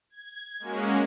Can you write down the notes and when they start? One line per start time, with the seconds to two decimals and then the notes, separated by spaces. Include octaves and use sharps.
0.10 G#6
0.59 G#3 A#3 C#4 F#4